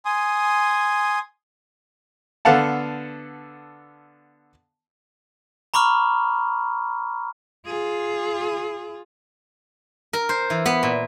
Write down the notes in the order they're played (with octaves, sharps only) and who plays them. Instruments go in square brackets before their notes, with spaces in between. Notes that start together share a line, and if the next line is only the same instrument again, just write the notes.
[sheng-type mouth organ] G#5 C6 D#6
[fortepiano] D3 B3 A4 F5 F#5 A5
[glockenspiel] A#5 B5 C#6 D6 F6
[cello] F4 G#4
[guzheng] A#4
C5
E3
B3
A#2